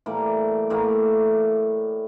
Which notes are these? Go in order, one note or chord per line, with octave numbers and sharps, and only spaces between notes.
A2 E3 G3 A#3 D5
A2 E3 A#3